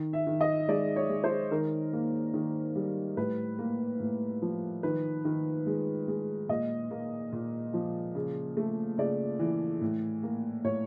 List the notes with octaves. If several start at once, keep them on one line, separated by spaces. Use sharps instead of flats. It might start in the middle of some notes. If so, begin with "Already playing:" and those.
Already playing: D#3
E5
D#3
D#5
G#3 D5
C#5
G#3
C5
D#3 A#4
A#3
D#3
G3
A2 B4
A#3
A2
F3
D#3 B4
D#3
G#3
G#3
A#2 D#5
A#3
A#2
F3
C#3
A3
C#3 D5
E3
A2
A#3
A2 C#5